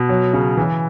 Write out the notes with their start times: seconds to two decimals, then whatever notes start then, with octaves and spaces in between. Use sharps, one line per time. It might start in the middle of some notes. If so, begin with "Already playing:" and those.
Already playing: B2
0.09 F#3
0.33 C#3
0.57 E3